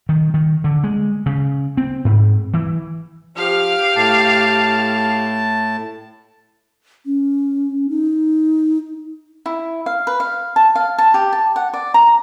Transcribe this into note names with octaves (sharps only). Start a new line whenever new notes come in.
D#3
D#3
D3
G#3
C#3
C4
G#2
E3
F3 G4 F5 F6
A2 A5
C#4
D#4
E4
F5
B4
F5
A5
F5
A5
G4
A5
F#5
D5
A#5